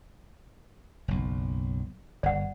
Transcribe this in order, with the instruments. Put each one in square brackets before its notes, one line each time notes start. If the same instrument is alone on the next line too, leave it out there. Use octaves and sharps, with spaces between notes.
[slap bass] F#1 B1
[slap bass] G1 [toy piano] D5 F#5